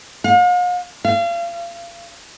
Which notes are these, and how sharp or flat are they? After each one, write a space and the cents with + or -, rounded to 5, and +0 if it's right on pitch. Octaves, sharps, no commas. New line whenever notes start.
F5 +45
F5 -35